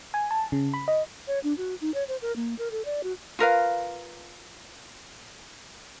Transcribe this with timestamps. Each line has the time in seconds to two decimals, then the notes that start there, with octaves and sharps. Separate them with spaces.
0.14 G#5
0.31 A5
0.52 C#3
0.74 B5
0.88 D#5
1.27 C#5
1.43 D4
1.57 F#4
1.81 D#4
1.94 C#5
2.08 C5
2.22 A#4
2.36 A#3
2.58 A#4
2.71 A4
2.85 D5
3.03 F#4
3.39 F4 A#4 B4 F5